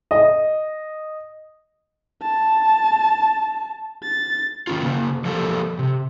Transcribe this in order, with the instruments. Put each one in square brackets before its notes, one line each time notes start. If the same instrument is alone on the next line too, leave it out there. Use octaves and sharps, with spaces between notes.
[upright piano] D#5
[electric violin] A5
A6
[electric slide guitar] D#3 C#4 F4
C#3 A#3
F3 G3 A#3 A4
C3